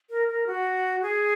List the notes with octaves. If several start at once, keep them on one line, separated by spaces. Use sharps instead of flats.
A#4
A#4
F#4
G#4